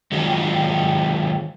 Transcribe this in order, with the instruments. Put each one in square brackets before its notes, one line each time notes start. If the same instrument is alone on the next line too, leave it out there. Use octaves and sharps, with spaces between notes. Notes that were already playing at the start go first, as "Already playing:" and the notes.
[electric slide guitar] D#3 F#3 G#3 F4 F#4